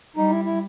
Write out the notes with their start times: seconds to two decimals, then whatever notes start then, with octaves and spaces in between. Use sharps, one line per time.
0.16 G3 D#4
0.30 E4
0.45 E4